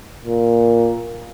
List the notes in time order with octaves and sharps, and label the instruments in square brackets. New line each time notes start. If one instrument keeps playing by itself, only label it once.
[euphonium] A#2